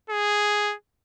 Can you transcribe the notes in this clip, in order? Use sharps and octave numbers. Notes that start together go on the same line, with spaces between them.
G#4